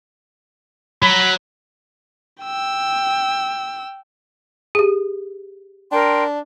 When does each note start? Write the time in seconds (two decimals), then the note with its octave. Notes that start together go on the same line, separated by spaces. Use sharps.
1.02 F#3 B5
2.43 G5 E6
4.75 G4 G#4
5.92 D4 A#4 G5 C6